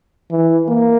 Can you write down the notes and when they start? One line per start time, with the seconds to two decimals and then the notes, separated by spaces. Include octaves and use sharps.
0.30 E3
0.69 A#3